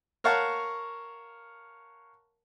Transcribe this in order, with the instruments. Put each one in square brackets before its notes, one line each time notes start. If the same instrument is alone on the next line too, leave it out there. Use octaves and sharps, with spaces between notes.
[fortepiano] A#4 C#5 F5 F#5 A5 C#6